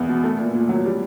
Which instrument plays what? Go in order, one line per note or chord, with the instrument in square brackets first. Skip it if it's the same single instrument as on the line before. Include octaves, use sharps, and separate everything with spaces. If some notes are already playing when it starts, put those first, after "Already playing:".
Already playing: [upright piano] E2 G#3 B3
B2
A3
A#2
A#2
F#3
G3